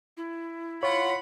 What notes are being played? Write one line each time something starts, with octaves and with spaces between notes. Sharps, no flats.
E4
F4 C#5 F#5 B5